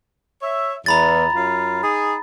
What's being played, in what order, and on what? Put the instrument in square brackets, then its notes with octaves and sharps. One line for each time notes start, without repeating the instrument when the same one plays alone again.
[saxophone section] C#5 E5
[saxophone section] E2 [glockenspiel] A#5 B5 A6
[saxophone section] F#2 F4
D#4 G#4